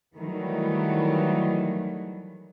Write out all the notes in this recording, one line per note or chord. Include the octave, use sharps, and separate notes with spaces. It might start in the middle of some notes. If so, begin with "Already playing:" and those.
D#3 E3 F#3 G3 A3